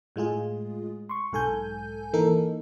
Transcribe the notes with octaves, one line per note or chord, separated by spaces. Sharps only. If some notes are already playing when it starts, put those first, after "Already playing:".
A2 G#3 F4 G#4
C6 C#6
B1 G#2 A4 G#5 G6
E3 A#3 D#4 A4 A#4